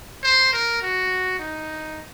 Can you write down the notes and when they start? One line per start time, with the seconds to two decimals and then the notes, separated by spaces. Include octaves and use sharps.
0.23 C5
0.53 A#4
0.82 F#4
1.39 D#4